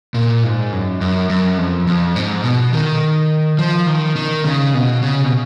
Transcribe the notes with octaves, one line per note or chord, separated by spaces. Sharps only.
A#2
G#2
F#2
F#2
F#2
F2
F2
G#2
B2
D#3
F3
D#3
D#3
C#3
B2
C#3
B2